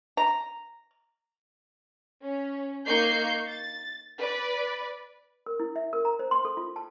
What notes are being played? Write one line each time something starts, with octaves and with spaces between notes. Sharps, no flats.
A#5
C#4
A#3 D#4 C#6 G6 C7
A6
B4 D5
A#4
E4
E5
A#4
A#5
C5
C6
A4
F4
A5